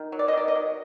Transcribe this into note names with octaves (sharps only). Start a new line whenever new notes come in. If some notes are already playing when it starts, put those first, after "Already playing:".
Already playing: D#3
F#3
D5
D#5
D#3 D5
D#5
F#3